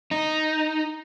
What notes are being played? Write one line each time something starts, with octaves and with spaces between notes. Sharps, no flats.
D#4